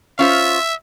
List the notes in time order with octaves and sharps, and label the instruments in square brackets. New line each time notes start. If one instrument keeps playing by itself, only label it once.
[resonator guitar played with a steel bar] C#4 F4 C5 [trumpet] E5